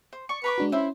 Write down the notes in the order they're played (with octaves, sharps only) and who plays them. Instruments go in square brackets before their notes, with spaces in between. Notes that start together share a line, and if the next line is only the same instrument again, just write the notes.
[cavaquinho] C5
[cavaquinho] D5 C#6 [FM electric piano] C#7
[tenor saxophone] B4 [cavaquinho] A#5 C#6 D6
[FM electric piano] G#3 D4 F#4
[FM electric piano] C#4 [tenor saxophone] E4 [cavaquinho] C5 E5